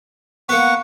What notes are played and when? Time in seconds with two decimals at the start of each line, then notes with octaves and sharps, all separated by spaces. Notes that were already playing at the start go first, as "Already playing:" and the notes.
0.49 A#3 B3 F#5 C#6